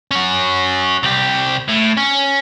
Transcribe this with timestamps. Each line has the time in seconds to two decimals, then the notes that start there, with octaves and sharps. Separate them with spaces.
0.11 C#4 F#4
1.03 C2 G4
1.68 A2
1.97 C#4